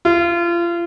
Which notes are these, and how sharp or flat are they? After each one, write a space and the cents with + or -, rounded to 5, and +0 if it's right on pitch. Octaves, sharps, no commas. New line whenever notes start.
F4 -30